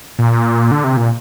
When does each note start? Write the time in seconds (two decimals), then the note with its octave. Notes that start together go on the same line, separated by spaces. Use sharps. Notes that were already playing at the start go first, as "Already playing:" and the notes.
0.19 A#2
0.71 D3
0.84 C3
0.97 A#2